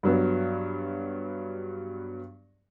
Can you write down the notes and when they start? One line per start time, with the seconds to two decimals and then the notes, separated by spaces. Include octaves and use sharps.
0.03 G2 F#3 B3